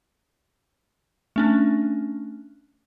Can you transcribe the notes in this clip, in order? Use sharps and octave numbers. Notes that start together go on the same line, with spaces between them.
A3 C#4 D4